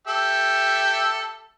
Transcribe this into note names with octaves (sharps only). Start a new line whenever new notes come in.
G4 A4 E5